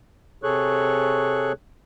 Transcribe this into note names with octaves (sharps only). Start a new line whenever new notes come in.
C3 G#4 A4 C#5 C#6 F#6